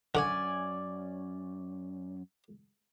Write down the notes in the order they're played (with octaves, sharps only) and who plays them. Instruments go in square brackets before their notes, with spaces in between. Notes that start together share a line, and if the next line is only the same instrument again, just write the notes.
[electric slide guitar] F#2 [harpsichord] D3 [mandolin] C#4 D5 G#5